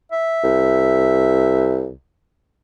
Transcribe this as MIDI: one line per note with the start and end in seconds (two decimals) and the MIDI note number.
0.12 1.85 76
0.44 1.92 36